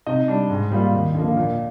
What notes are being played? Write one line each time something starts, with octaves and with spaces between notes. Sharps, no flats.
C3 D#4 D#5
G3 D4
G#2
G3 A#3 F4
D#2
D3 F3 A#3
A#2